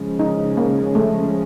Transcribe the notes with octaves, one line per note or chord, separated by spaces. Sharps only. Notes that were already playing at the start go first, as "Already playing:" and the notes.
Already playing: C#3 F3 G#3 C#4
D#4
A#3
A3